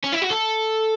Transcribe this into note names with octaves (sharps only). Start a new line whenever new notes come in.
C#4
E4
F#4
A4